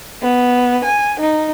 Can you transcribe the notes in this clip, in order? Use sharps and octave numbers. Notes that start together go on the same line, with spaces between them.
B3
G#5
D#4